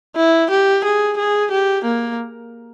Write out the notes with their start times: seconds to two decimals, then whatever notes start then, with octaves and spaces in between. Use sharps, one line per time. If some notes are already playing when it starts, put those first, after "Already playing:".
0.16 E4
0.50 G4
0.84 G#4
1.17 G#4
1.51 G4
1.85 A#3